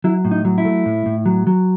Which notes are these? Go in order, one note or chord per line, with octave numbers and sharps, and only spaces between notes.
F#3 E4
A2
D#4
F#3
E4
A3
A2
A2
F#3
F#3